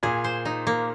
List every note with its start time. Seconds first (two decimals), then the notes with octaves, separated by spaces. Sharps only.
0.03 A#2 G#4
0.24 C5
0.45 D#4
0.67 A#3